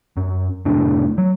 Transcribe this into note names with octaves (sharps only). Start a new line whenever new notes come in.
F#2
F1 A2 D4
F#3